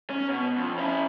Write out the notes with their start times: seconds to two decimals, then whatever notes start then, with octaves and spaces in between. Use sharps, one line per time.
0.10 C#4
0.29 B2
0.58 F2
0.78 C#4 E4